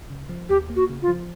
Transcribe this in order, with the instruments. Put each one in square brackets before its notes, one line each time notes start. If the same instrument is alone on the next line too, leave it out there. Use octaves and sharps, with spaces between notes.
[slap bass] C#3
F3
[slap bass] D#2 [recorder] G4
[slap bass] A#3
[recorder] F#4
[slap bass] C#3
[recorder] F4
[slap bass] F3